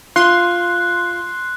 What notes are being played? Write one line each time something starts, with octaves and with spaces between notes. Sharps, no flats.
F4 C6 F#6